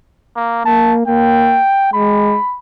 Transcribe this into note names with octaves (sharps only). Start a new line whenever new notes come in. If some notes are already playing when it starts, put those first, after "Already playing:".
A#3
A#3 A5
A#3 G5
G#3 B5